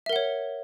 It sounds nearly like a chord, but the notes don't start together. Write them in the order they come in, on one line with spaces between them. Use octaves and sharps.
E5 A#4 F#5 C#5